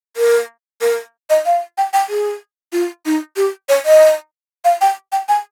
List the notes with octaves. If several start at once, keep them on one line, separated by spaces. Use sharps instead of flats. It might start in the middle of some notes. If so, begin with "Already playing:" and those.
A#4
A#4
D#5
F5
G5
G5
G#4
F4
D#4
G4
C#5
D#5
F5
G5
G5
G#5